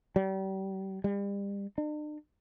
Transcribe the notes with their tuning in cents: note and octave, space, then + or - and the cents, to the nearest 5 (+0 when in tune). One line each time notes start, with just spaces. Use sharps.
G3 -35
G3 +35
D4 +45